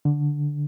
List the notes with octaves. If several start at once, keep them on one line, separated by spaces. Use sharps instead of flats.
D3